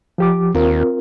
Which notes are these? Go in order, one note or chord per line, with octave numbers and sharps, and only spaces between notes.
F3 G4 D6
D#2 C4 F4 A#4